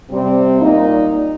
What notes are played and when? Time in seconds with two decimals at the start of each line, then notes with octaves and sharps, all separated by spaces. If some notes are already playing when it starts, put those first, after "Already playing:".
0.10 C3 G3 C4
0.60 A#2 G3 A#3 D#4